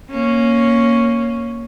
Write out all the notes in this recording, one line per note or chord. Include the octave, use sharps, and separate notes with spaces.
A#3 C#4